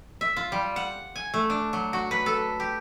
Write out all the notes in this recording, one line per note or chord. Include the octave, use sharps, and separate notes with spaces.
E5
F4
G3
F#5
G#5
A3
D4
F#3
F#4
B4
A4
G4